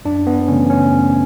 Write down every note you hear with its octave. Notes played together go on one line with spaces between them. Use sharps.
F#2 D4
B3
C#3 E3 A3 C#4
C#4
F#2